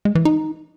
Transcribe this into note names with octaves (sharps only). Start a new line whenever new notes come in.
G#3
E3
D#4